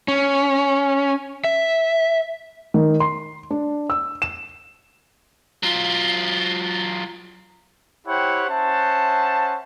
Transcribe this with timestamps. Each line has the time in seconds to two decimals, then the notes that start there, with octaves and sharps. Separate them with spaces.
0.08 C#4
1.44 E5
2.74 D#3
3.00 C6
3.50 D4
3.90 E6
4.22 E7
5.63 F#3 F4
8.07 E4 G4 C5 C#5 F#5 G5
8.49 C#4 C5 E5 F#5 A5